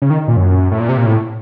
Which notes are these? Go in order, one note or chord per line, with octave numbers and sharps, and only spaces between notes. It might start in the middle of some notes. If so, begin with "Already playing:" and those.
C#3
D#3
A#2
F#2
A2
A#2
C3
A#2
A2